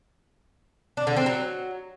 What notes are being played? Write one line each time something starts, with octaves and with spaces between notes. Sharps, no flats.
D4
D3
C4
F#3